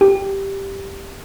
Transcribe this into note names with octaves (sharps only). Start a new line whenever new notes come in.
G4